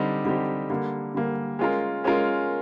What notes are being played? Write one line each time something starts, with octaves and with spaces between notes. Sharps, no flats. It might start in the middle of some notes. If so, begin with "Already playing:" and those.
Already playing: D3 G3 C4 D#4 G4
D3 G3 C4 D#4 G4
D3 G3 A#3
D3 G3 A#3
G#3 C#4 F4 A#4
G#3 C#4 F4 A#4